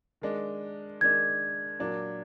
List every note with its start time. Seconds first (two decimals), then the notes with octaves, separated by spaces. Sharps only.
0.22 D#3 G#3 D4
1.01 D#3 G#3 D4 G#6
1.79 A#2 F#3 D4